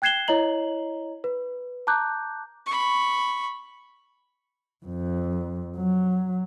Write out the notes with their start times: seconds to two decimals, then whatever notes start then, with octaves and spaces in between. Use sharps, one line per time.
0.02 G5 F#6 G#6 C7 E7 G7
0.28 E4 C#5 D#5 A#5 F#7
1.24 B4
1.87 A5 A#5 D6 F#6 G6
2.67 B5 C#6
4.86 F2
5.77 F#3